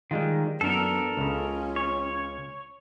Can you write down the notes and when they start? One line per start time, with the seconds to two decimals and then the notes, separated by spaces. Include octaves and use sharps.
0.11 D#3 G3 G#3 F4
0.61 F#2 B3 D4 A4 A#4
1.17 C#2 C#3 C#4 F4
1.76 C#5